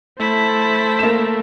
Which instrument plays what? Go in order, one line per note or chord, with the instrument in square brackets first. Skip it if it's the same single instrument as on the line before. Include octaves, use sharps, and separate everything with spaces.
[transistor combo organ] A3 [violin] E4 B6 [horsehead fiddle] C5 A5
[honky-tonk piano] A#3 E7